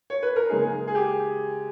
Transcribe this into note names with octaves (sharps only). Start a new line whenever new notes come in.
C#5
B4
A#4
C#3 G#3 D#4 G#4
G#4
G4